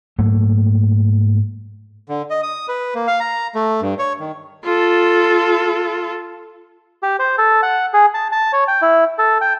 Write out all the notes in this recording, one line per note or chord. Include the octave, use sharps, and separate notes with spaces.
G#2 F#3 A3 A#3
D3
D#5
D#6
B4
A#3
F5
A#5
A3
G2
C#5
D#3
F4 A4
G4
C5
A4
F#5
G#4
A5
A5
C#5
G5
E4
A4
G5